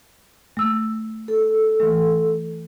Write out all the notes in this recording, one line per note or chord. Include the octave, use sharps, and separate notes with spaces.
A3 E6
A4
E3 A3